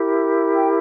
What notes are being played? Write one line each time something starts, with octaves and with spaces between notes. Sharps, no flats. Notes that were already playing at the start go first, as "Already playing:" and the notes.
Already playing: E4 G4 A#4
G5